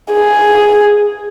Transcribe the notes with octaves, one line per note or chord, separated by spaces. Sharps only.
G#4